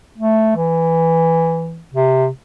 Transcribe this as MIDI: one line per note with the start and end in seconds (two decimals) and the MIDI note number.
0.18 0.57 57
0.57 1.83 52
1.93 2.27 48